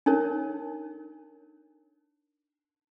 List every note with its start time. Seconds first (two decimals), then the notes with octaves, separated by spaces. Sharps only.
0.06 D4 D#4 A#4 C#5